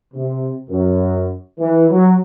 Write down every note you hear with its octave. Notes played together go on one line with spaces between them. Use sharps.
C3
F#2
E3
F#3